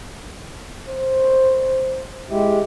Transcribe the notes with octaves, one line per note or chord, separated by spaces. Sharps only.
C5
G#3 E4 G4